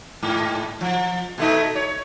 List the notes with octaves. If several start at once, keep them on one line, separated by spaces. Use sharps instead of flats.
G#2
F3
B2 A3 D#4
C#5